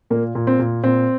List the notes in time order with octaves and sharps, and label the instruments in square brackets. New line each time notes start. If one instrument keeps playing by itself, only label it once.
[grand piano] A#2 A#3
A#2
C4
A#2
A#2 C4